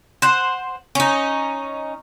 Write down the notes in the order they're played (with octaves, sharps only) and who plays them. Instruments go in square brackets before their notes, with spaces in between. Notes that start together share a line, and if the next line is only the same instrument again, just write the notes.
[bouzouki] C5 F#5
C#4 D#4